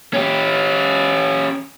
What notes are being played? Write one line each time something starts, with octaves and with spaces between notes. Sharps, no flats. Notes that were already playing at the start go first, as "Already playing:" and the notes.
C#4 G4